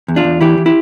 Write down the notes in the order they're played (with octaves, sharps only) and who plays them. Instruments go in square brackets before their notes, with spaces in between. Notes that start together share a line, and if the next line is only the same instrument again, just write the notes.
[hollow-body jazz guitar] E2
D4 F4
E2
E3 E4 G4
E3
E4 G4